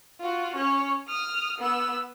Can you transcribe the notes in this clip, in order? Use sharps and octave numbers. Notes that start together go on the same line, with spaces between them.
F4 F#4
C#4 C#5
D#6 F6
B3 E6